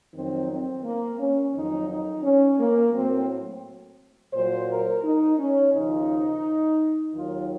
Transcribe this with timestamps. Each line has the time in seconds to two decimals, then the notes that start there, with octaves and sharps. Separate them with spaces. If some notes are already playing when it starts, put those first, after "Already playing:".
0.14 F2 D#3 F#3 C4
0.49 C4
0.84 A#3
1.19 C#4
1.54 F2 D#3 F#3 D#4
1.89 D#4
2.23 C#4
2.59 A#3
2.94 A2 F#3 C4
4.33 A#2 F#3 C5
4.69 A#4
5.03 D#4
5.38 C#4
5.73 D#2 C#3 F3 D#4
7.13 D#2 D#3 F#3 F4